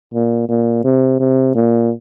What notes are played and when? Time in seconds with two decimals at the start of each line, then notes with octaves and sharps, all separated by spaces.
0.14 A#2
0.49 A#2
0.84 C3
1.20 C3
1.55 A#2